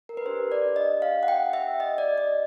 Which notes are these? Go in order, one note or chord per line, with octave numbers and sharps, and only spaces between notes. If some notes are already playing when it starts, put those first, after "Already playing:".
A#4
B4
D4 G4 C5
D5
D#5
F5
F#5
G5
E5
D#5
D5
D#5